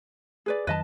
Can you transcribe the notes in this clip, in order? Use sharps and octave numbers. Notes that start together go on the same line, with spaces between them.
G#4 B4 D5
F2 D#3 F#3 B4 D#5 A5